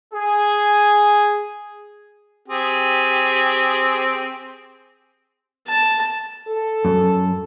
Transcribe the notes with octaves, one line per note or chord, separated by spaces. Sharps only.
G#4
C4 G4 G#4
A5
A4
F#2